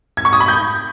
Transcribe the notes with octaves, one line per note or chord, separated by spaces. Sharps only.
G#6
C#6
D#6
B5
G6